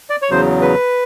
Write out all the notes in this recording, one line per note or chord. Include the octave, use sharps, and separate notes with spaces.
D5
C#5
E2 C#3 F#3 C5
B4